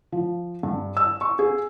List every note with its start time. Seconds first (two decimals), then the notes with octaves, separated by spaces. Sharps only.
0.12 F3
0.63 G2
0.97 E6
1.21 C#6
1.39 G#4